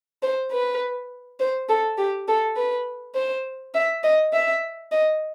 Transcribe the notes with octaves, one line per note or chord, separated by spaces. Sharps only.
C5
B4
C5
A4
G4
A4
B4
C5
E5
D#5
E5
D#5